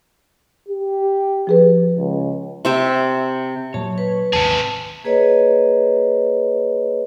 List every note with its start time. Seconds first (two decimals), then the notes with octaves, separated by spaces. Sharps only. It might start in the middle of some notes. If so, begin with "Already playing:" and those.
0.69 G4
1.47 F3 G#4 B4
1.97 C#2
2.65 C3 G4 E5
3.74 A#2 F#3 C#5 A5
3.98 B4
4.33 G#1 D#2 C3 G#4 A5
5.04 A#3 G#4 B4 C#5 D#5